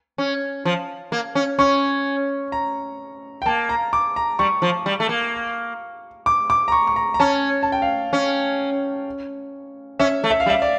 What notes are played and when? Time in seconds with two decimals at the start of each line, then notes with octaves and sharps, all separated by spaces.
0.18 C#4
0.65 F3
1.12 A#3
1.35 C#4
1.59 C#4 C#6
2.52 A#5
3.42 G5
3.46 A#3 A5
3.69 A#5
3.93 D6
4.16 A#5
4.39 G3 C#6
4.62 F3
4.86 G3
5.00 A3
5.09 A#3
6.26 D6
6.50 D6
6.68 A#5
6.72 C#6
6.87 C#6
6.96 A#5
7.14 A#5
7.20 C#4 A5
7.63 A5
7.72 G5
7.82 F5
8.13 C#4
9.99 C#4 E5
10.24 A3
10.30 E5
10.40 F5
10.46 G3
10.50 E5
10.62 D5